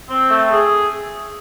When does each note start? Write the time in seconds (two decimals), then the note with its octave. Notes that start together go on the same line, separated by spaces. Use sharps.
0.10 C4
0.30 A3
0.51 G#4